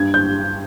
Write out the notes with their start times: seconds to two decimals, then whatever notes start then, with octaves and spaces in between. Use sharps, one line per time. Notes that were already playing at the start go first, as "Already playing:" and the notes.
Already playing: G2 G#6
0.14 G6